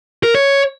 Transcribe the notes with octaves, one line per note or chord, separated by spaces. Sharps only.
A#4
C#5